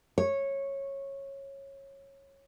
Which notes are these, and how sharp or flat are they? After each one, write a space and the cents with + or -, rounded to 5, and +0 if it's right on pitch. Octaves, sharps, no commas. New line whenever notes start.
C#5 -15